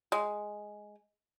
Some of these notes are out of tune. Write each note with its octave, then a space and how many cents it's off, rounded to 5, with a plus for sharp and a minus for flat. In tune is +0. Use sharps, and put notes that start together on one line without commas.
G#3 +5